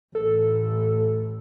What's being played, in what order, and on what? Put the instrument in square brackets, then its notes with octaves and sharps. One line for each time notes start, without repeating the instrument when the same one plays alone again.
[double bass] A1 A2 [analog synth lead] A4